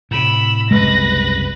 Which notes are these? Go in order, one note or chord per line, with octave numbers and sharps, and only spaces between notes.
A2 C3 B5 E6
F#1 C2 G#3 B4 A#6